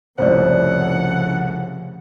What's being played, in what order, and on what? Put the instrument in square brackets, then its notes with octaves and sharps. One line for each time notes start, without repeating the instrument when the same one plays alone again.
[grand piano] C2 F2 A2 [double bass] C#3 F3 [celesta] C5 D5 [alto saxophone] F#5